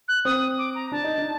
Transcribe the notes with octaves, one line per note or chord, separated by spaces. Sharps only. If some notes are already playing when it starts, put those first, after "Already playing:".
F#6
C4 D#6
D6
A#5
D4 A5
D#4
D4